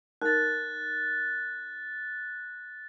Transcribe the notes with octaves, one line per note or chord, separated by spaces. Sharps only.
D#4 A#4 F#6 A6